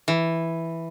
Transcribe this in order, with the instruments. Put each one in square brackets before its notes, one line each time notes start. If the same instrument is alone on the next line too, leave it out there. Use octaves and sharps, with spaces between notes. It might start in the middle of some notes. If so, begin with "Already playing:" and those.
[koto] E3